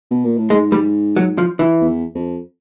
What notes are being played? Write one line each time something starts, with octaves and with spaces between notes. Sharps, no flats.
B2
A#2
A2
G#2 G#3
G3
F#3
F3
E3
E2
F2